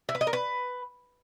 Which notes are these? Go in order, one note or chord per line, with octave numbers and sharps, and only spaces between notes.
E4
B4
D#5
A#4
B4